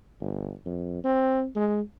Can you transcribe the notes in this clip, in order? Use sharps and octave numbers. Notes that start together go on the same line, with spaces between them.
G1
F2
C4
G#3